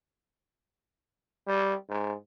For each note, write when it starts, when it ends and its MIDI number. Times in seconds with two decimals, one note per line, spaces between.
1.47 1.74 55
1.90 2.15 44